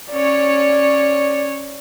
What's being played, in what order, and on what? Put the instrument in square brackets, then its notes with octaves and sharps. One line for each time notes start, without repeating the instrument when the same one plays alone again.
[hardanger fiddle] C#4 C#5 [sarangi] D5